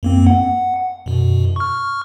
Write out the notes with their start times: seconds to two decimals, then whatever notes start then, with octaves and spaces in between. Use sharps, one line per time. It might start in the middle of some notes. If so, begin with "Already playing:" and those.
0.03 F#2 A#3 C4
0.27 F#5
1.06 F#2 B2
1.56 C#6 F6